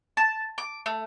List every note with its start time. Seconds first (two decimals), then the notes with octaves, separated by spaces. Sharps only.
0.17 A5
0.58 D6
0.86 A3